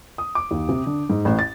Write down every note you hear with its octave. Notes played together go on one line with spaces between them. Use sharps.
D#6
D6
D#2
C3
D3
G#2
A1
A6